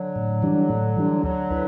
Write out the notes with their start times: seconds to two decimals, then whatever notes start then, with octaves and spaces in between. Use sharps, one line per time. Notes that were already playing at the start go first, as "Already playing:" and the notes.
Already playing: D3 F#3
0.16 A2
0.42 E3 G3 D4
0.70 A2
0.97 E3 G3 D4
1.23 D2 D3 F#3
1.51 E4 B4